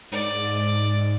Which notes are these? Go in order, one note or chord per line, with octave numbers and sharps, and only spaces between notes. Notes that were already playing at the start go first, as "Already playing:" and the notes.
G#2 D5